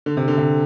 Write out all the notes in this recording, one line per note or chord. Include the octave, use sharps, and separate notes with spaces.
D3
C3
D3
C3